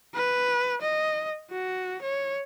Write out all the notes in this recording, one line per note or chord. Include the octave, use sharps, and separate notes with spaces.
B4
D#5
F#4
C#5